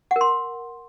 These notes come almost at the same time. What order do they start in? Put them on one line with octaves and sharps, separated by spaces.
F#5 A#4 C6